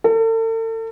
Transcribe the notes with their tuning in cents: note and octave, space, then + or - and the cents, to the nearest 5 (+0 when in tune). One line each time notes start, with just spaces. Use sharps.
A4 +40